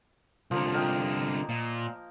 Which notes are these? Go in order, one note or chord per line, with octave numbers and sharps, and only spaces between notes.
C2 D3 F3 A#3
A#4 D#5 G5
A#2